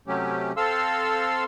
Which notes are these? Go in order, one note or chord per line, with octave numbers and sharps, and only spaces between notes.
C3 F#3 A3 C#4 G4
C4 A4 F5 C6 E6